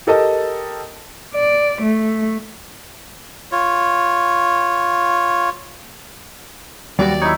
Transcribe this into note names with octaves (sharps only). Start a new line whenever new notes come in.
G4 A4 A#4 D#5 A5
D5
A3
F4 C#5
D#2 F#3 G3 F#4 G4 D5
D#4 E4 C#5